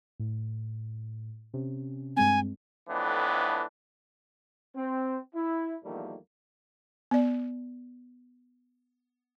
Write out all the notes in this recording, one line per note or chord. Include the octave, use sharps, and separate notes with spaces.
A2
C3 C#4
G2 G#3 C4 G#5
F2 A2 E3 B3 D4
C4
E4
E2 D#3 F3 G3 A3 A#3
B3 D5